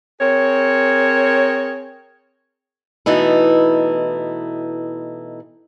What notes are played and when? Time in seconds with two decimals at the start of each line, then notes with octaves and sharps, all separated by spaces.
0.20 C4 G#4 A#4 C#5
3.06 B2 E3 A3 D#4 E4